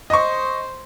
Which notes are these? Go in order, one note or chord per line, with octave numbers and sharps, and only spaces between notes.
C5 D#5 C#6